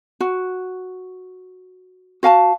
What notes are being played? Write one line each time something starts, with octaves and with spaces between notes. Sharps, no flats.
F#4
F#4 F5 G#5 A5